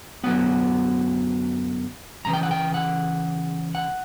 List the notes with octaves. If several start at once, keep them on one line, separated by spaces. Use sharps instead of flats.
F#2 D3 F#3 B3 F#5
F#2 C#3 E3 A#5
G5
F#5
G5
F#5
F#5